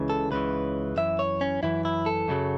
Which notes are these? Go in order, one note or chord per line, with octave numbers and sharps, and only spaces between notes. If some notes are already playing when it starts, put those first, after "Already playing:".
Already playing: C#2 C#3 E3
A4
C#2 C#3 E3 B4
F#2 E3 E5
C#5
C#4
F#2 E3 E4
E4
A4
F#2 C#3 F#3